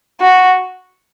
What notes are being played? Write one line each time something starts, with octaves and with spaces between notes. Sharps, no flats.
F#4